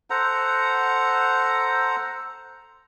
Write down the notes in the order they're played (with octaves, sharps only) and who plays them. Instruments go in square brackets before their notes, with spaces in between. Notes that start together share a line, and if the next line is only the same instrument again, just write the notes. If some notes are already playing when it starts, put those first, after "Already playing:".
[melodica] A4 C5 F#5 A#5